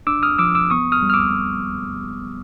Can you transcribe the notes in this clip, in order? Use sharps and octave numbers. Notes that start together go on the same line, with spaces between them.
D4 D6 E6
D#6 F6
F3 D6 E6
D6 E6
B3 C#6 D#6
D#6 F6
G3
F6
D6 E6